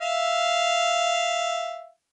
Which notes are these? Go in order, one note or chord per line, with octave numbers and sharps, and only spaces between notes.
E5 F5